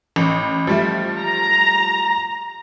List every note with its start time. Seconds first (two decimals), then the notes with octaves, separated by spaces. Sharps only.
0.16 A1
0.67 F3 G3 A3
1.20 A#5